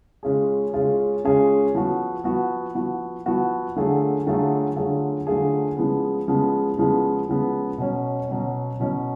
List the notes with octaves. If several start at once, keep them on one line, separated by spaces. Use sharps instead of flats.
C#3 G#3 C#4 F4 G#4
C#3 G#3 C#4 F4 G#4
C#3 G#3 C#4 F4 G#4
F3 B3 F#4
F3 B3 F#4
F3 B3 F#4
F3 B3 F#4
D3 F#3 A3 F4 G#4
D3 F#3 A3 F4 G#4
D3 F#3 A3 F4 G#4
D3 F#3 A3 F4 G#4
C#3 F3 G#3 B3
C#3 F3 G#3 B3
C#3 F3 G#3 B3
C#3 F3 G#3 B3
B2 F#3 C#4
B2 F#3 C#4
B2 F#3 C#4